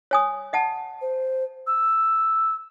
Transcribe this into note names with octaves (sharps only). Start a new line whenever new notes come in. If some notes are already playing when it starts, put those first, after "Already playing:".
C#5 G#5 D#6
D#5 F#5 A5
C5
E6